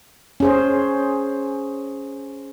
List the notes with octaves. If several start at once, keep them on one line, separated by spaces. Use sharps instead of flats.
C#4 G#4 C5